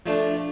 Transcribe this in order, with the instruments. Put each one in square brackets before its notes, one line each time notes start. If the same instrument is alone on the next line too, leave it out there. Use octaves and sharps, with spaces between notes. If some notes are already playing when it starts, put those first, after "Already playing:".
[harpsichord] F3 A3 D4